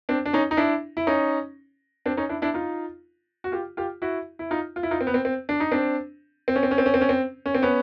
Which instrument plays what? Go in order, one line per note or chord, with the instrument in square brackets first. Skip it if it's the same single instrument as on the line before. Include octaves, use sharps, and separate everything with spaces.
[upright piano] C4 D4
D4
C#4 D#4
D#4
D4 E4
E4
C#4 D#4
C4 D4
C#4 D#4
D4 E4
D4 E4
D#4 F4
F#4
F4 G4
F4 G4
E4 F#4
E4
D#4 F4
F4
E4
D#4 F4
C4
B3
C4
C4
D4
D#4
C4 D4
C4
C#4
C4
C#4
C4
C#4
C4
C#4
C4
C#4
C4
B3 C#4